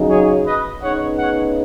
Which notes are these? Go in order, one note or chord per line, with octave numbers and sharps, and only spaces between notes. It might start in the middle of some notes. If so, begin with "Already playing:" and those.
Already playing: C#3 F#3 D#4
G#4 C#5
B4 D#5
C#3 B3 D#4 C#5 F#5
C#5 F#5